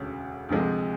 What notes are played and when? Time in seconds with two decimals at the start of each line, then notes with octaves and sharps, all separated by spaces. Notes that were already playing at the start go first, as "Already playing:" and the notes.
Already playing: E1 D2 C#3
0.49 D2 C3 F3 G#3